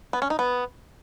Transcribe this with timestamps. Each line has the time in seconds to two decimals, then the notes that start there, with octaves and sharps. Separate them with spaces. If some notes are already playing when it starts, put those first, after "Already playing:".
0.13 B3
0.22 C#4
0.30 D#4
0.39 B3